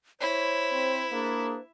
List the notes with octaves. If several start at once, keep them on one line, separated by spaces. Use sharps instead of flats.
E4 C5 C#5
C4
A#3 D4 G#4